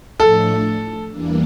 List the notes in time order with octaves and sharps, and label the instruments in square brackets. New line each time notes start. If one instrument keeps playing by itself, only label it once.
[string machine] A2 F3 A3 D4 [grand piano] A4
[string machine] E2 E3 G3 A#3 D4